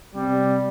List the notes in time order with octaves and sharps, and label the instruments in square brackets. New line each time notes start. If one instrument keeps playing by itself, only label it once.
[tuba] C3 [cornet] G3